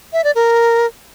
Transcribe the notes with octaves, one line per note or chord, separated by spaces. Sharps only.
E5
D5
A#4